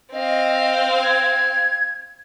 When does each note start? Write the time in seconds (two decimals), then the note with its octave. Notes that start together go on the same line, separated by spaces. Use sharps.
0.13 C4 D#5 F5
1.03 G#6